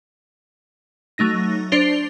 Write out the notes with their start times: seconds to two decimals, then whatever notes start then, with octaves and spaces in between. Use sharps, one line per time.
1.18 F#3 A3 D#4 A#6
1.72 D4 C5 C7 F7 G7